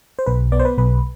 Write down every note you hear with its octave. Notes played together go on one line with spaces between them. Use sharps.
C5
B1 B4
B3 D5
C5
B4
B1 B4